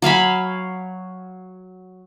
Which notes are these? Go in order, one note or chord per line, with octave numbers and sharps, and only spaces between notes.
F#3 F5 G#5 B5